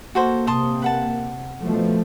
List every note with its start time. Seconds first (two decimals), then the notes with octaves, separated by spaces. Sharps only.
0.15 A#3 F#4 A4 C5
0.47 C3 A5 C6 D#6
0.82 B4 F#5 A5
1.63 A#1 F2 B2 F3 A3